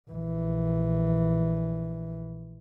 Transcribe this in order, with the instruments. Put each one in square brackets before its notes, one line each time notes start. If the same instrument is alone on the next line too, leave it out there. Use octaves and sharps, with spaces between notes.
[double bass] A#1 E3